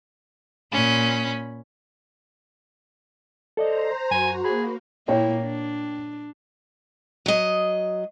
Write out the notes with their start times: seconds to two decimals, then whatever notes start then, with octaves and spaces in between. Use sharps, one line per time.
0.71 A#2 C#4 B5
3.57 A4 C5 D5 D#5 A#5
4.11 F#2 F#4 G#5
4.44 A#3 G#4 B5
5.08 A#2 A#3 E4 C#5 G5
5.42 D4
7.26 F#3 D#5